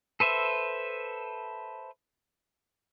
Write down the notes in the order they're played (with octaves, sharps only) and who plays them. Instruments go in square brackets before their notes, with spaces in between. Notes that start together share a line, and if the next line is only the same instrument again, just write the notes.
[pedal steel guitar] A4 B4 C5 E5